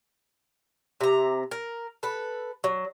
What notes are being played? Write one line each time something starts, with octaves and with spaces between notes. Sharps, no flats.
C3 A#5
A#4
A4 B4
F#3